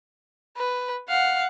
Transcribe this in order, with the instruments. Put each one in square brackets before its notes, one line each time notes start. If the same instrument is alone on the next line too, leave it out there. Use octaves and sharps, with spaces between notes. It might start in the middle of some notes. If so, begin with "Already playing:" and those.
[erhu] B4
[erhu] F5 [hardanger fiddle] F#5